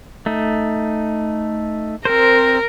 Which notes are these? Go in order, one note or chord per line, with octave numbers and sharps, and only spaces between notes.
A3 D#4
C4 A#4 C5